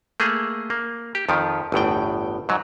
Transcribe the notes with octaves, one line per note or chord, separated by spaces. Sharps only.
A3 A#3 G#4
A#3
G4
F2 D#3 F3
G1 E2 A2 G5
G#2 F#3